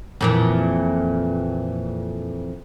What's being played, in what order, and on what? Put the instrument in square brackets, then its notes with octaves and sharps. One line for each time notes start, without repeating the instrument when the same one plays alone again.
[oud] F2 A#2 E3